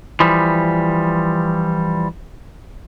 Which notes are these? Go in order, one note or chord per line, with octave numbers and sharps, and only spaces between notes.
E3 F3 G3